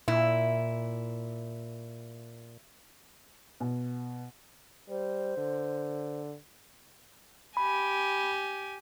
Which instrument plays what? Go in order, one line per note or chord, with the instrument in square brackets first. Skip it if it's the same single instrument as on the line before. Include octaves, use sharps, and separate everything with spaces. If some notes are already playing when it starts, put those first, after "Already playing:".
[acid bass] A#2 [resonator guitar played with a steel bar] E4
[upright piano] B2
[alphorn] G3 [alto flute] C5
[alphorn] D3
[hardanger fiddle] G4 G#5 [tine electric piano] B5